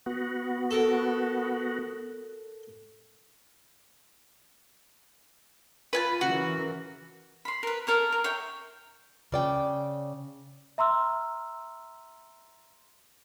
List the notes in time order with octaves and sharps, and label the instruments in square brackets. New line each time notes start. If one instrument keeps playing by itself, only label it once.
[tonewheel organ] B3 F#4
[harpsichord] A4 A#4
[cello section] F4 [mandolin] B4 G#5 A5
[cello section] C#3 E3 A#4 [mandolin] F#4
[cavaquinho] B5 C6
A#4 B4
A4 A#4 C#5 C#6
A#4
C#5 E5 G5
[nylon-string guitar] C#3 D5 G5
[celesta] E5 A#5 C6 E6 F6